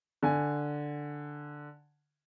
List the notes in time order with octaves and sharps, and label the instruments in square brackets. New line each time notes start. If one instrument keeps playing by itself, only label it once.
[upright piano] D3 G#5